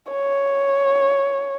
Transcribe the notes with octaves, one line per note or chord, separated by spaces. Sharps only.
C#5